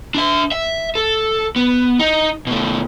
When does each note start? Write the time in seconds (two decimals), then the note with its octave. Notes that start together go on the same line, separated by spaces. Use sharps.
0.15 D4 E5
0.52 E5
0.95 A4
1.56 B3
1.99 D#4
2.47 B2 A3